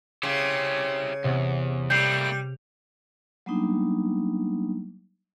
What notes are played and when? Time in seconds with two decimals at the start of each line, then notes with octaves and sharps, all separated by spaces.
0.23 C#3 E4 G4 C5
1.24 E2 C3 F#5
1.90 G3 A3 A#3 E4 G6 C7
3.46 F#3 G3 A#3 B3 D4 D#4